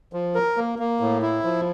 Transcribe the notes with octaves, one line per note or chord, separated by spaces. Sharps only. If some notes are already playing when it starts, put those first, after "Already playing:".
F3
A#4
A#3
A#3
A2
E4
F3